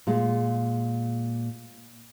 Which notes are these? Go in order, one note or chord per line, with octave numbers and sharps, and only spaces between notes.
A#2 G#3